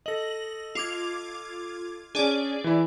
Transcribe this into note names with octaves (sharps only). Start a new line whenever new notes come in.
A4 D#5 A#6 F#7
F4 D6 G#6
C#4 D4 G#4 D5
E3 E4